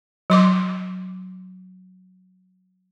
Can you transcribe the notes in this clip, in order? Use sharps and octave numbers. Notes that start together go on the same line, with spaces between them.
F#3 C6 D6